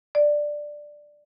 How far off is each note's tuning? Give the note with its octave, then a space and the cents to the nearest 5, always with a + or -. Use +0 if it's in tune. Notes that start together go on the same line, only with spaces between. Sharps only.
D5 +5